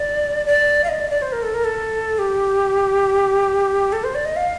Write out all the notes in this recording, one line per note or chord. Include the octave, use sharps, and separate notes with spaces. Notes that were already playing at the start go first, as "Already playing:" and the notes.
Already playing: D5
D5
F5
D#5
D5
D5
C5
A#4
A4
A#4
A4
G4
A4
C5
D5
D#5
F5